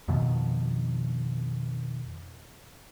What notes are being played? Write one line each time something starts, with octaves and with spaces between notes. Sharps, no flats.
F2 B2 D#3 F3